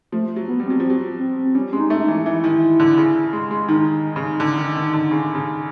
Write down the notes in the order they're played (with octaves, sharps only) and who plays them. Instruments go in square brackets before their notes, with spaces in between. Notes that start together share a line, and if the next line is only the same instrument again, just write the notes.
[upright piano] F3 [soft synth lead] A3
[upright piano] F#3
[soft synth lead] B3
[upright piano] G3
[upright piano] F#3 [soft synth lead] C4
[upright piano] F3
F#3
[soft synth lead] C4
[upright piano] G3 [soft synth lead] C#4
[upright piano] G#3
[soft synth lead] D#4
[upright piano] A3
[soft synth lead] D#4
[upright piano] E3
[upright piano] E3 [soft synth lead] E4
[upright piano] D#3
D3
C#3
G#3
G#3
[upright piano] D#3 [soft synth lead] D#4
[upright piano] C#3
D3
D#3
D#3
D3
C#3
C#3